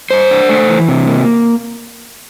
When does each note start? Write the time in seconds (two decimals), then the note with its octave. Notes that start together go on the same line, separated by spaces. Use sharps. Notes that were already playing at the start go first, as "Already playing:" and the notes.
0.11 G2 C5
0.31 D4
0.49 A3
0.69 E3
0.89 C3
1.08 A#3